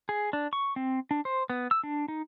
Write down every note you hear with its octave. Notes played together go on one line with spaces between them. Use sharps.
G#4
D4
C#6
C4
D4
C5
B3
E6
D4
D#4